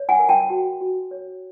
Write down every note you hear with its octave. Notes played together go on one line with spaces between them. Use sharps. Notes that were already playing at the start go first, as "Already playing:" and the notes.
Already playing: C#5
F#5 G#5
A#4
G5 A5
F#4
F#4
C#5